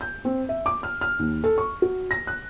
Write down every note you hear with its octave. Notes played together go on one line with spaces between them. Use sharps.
G6
C4
E5
D6
F6
F6
D#2
A4
C#6
F#4
A#6
F#6